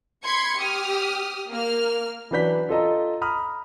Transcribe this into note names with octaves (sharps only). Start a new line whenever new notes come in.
B5 C6 G#6 C#7
G4 D#6 F6
A#3 F6
E3 F#3 D4 B4 G6 B6
F4 A4 D#5 A#5
A#5 B5 D#6 F6